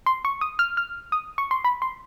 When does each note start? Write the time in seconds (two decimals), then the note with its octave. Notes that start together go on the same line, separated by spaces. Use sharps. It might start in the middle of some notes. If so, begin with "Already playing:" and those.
0.06 C6
0.25 C#6
0.41 D#6
0.59 F6
0.77 F6
1.12 D#6
1.38 C#6
1.51 C6
1.64 B5
1.82 C6